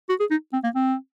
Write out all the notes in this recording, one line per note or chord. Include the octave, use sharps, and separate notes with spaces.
F#4
G#4
D#4
C4
A#3
C4